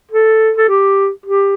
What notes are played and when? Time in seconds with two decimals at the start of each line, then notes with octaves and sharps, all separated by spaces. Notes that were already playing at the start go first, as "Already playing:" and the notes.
0.11 A4
0.57 A4
0.69 G4
1.26 G4